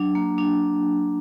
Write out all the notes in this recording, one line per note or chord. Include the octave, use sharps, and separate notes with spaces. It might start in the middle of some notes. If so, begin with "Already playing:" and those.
Already playing: F#3 D4
A#3
D4